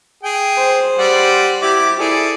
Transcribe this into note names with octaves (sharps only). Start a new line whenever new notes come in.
G#4 G5
C5
G3 D5 F#5
E4 G4 D6
E4 G#4 A4 D5